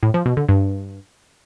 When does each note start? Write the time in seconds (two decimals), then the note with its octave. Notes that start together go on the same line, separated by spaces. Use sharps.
0.03 A2
0.14 F3
0.26 B2
0.37 D3
0.49 G2